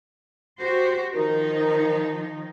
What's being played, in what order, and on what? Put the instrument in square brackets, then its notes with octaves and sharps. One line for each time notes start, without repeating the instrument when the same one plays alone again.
[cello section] F#4 G4 C5
[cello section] D#3 F3 D#4 [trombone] A#4